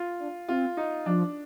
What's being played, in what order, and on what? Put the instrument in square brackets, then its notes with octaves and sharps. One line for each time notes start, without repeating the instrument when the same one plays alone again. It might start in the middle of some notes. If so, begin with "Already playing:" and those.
Already playing: [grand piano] F4
[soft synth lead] D4
[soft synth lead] C4 [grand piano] F4
[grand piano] D#4
[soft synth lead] F3 [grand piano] D4